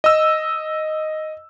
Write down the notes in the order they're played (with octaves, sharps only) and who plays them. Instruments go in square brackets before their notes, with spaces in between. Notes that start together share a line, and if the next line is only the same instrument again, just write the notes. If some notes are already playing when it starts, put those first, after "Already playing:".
[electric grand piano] D#5 E6